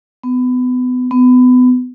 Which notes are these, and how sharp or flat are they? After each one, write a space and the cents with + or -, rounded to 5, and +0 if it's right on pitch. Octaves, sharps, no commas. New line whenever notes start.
B3 +30
B3 +30